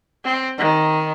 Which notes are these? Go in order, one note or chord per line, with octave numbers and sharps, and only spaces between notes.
C4
D#3